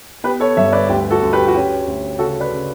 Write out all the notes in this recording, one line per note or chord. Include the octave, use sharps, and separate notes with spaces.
B3 G4 B4
A4 C#5
G2 C#5 E5
B4 D5
D2 G4
F#4 A4
D2
G4 B4
F#4
C#4 G4
D2
C#3 F#4 A4
B4 D5
C#3